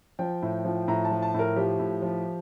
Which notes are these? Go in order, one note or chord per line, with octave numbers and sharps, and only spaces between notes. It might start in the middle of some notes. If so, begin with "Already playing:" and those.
F3 G5
A2
F3
A2 A#5
A5
F3
A5
A2 A#4
F3 G4
A2
F3